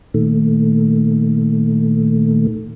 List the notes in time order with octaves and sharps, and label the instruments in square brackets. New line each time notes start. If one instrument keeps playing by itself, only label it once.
[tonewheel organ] A#2 D#3 A3